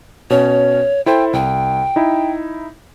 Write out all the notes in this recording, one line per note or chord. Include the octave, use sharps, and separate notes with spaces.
B2 C#4 C#5
E4 A4 C5 G5
C2 G5
D#4 E4